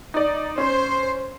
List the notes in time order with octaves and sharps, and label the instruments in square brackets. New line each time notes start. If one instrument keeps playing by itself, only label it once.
[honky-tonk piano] D#4 D5
[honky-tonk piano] C#4 [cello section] C5